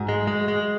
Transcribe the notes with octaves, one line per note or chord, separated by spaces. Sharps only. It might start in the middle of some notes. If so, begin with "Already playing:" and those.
Already playing: G#2 F#4
G#3
G#3
G#3